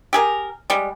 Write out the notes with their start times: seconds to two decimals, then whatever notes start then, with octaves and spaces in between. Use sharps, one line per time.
0.13 G4 G#4 A#4
0.70 G3 G#3